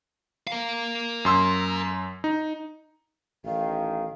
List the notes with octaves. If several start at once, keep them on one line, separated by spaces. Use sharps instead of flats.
A#4 F5
F#2 C6 E6
D#4
A1 D#3 F5